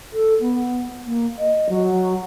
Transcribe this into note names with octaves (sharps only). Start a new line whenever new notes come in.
A4
B3
A#3
D#5
F#3